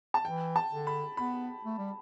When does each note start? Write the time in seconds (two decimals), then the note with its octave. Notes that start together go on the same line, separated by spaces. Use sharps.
0.14 A5
0.24 E3 G5
0.56 A5
0.71 D3
0.87 B5
1.17 B3 B5
1.65 A3
1.78 G3